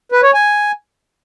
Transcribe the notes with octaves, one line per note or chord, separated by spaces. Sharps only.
B4
C#5
G#5